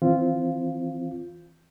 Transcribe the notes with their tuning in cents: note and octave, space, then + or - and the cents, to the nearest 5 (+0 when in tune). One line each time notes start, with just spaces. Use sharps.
E3 -15 C4 +0 F4 -10